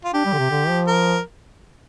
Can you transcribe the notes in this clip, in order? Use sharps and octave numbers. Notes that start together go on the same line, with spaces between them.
F4
D4 G4
G3
D3
C3
D3
F3
A#4